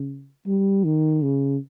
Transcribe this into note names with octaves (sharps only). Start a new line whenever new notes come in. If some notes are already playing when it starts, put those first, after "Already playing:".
Already playing: C#3
G3
D#3
C#3